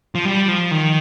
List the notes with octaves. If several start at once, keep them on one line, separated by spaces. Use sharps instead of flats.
F3
G3
F3
D#3